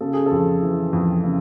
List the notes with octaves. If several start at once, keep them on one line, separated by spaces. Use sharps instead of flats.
C#3 A4
G#4
F2 A4
E3
F2
C#3